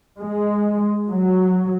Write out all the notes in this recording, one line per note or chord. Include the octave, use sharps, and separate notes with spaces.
G#3
F#3